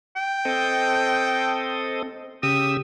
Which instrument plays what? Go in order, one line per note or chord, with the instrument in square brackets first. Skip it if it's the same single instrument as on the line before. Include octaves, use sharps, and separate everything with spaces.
[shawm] G5
[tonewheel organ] C4 A4 D#5
[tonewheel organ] C#3 G4 E6 [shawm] D#6